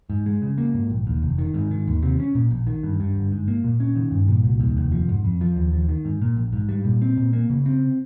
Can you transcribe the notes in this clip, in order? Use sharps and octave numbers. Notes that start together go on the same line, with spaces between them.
G#2
G#3
C#3
A#3
G#2
A#1
D#2
F1
D#3
G#2
D#3
D#2
C3
C#4
A#2
A#1
D#3
G2
G2
G1
G#2
A#3
A#2
C#4
D#3
G2
A#2
C2
D#2
F1
F3
G#2
F2
F3
D#2
F3
D#3
G#2
A#2
A#1
G#2
G3
A#2
C4
A#2
A#3
C#3
C4